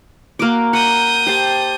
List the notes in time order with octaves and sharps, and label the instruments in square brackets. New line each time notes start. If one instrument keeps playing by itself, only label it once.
[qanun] A#3 F#4 D6
[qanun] F#5 [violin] D#6 G6
[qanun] G4 C5 A5